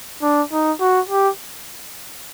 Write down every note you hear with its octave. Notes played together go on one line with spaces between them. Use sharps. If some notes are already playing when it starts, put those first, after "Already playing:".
D4
D#4
F#4
G4